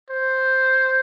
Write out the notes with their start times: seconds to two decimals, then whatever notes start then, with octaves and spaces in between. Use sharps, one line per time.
0.10 C5